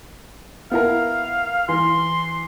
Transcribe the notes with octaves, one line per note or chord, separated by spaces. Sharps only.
B3 E4 A#4 F5
E3 C6